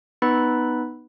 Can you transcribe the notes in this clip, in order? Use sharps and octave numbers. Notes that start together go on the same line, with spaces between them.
B3 D#4 B4 B5